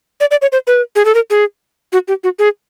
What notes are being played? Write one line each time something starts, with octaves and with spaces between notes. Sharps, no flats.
D5
D5
C#5
C5
B4
G#4
A4
A#4
G#4
F#4
G4
F#4
G#4